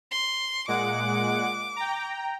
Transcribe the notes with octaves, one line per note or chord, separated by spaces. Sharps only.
C6
A#2 G#3 F#5 D6
G5 A#5